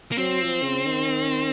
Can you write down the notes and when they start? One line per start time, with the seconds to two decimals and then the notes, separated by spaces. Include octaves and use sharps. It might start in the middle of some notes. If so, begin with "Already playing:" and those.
0.12 A#3
0.18 F#3 C4
0.41 F3
0.63 C#3
0.86 D#3